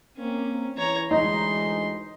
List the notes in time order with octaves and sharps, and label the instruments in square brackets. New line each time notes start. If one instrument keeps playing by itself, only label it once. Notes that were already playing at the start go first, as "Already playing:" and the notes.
[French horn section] A#3 C4 [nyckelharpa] C#4
[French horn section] E3 [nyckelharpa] C#5 A#5
[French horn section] D2 E3 G#3 [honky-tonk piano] D#4 [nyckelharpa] C6